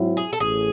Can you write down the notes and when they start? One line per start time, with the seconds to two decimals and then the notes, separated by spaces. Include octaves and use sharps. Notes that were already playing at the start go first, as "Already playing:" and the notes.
Already playing: G#2 F#3 C4 E4
0.17 G#4
0.33 A4
0.40 A1 A2 G#4